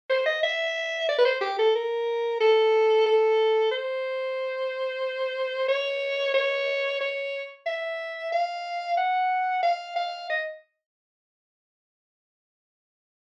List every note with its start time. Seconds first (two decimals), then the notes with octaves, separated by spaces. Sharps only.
0.10 C5
0.26 D#5
0.43 E5
1.09 D5
1.18 B4
1.25 C5
1.41 G4
1.59 A4
1.75 A#4
2.40 A4
3.06 A4
3.71 C5
5.68 C#5
6.34 C#5
7.01 C#5
7.66 E5
8.32 F5
8.97 F#5
9.63 F5
9.96 F5
10.30 D#5